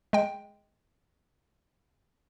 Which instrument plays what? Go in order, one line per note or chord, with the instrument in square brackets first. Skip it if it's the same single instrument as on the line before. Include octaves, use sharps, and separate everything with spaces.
[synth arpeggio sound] G#3 G5